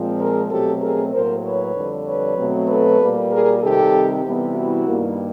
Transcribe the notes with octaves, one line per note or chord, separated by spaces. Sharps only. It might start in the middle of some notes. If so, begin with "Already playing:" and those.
Already playing: A#2 F3 G#3 C4
G#4 A#4
B2 F#3 A3 C4 G4 A4
G#4 A#4
A2 F#3 A#3 A#4 C5
B4 C#5
F2 D3 G3
B4 C#5
B2 F#3 A3 C4
A4 B4
A#2 G3 A#3
G#4 A#4
C3 D#3 G3 C4 G4 A4
C3 E3 G3 B3
E4 F#4
G2 D#3 G3 A#3